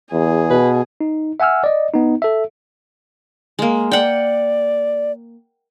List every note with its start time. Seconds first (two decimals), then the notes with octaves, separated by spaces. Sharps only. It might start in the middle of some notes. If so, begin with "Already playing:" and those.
0.12 E2 G#4
0.50 B2 B4
1.01 D#4
1.40 E5 F#5 G#5 E6 F6
1.64 D5 D#5
1.94 B3 D#4
2.22 A4 E5
3.59 G#3 A#3
3.91 D5 F#5 G5